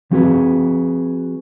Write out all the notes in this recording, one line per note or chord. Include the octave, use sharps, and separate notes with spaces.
F3 C4 F#4 G#4 B4